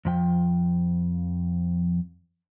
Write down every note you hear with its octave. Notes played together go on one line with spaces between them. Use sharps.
F2 F3 G5